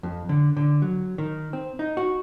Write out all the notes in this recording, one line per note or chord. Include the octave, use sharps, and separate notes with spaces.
F2
D3
D3
F#3
D#3
C4
D#4
F#4